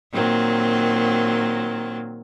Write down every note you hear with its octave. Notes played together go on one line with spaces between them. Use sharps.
A#2 D#3 F#3 C4